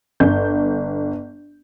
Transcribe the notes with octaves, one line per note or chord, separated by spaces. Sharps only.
G1 G6